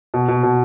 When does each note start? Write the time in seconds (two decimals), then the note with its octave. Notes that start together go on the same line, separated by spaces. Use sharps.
0.14 B2
0.28 B2
0.43 B2